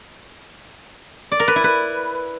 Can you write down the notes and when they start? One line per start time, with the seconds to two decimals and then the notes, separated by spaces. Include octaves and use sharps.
1.32 D5
1.40 A#4
1.48 B4
1.56 E4
1.64 B4